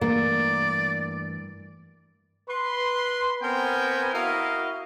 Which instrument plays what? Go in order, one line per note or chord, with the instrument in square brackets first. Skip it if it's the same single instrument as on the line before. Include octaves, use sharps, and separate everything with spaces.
[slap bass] G2 E3 A3 [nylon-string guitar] A#3 [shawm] D5
[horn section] B4 C6
B3 C4 A#4 C5 G5 G#5
E4 F#4 A#4 D#5 F5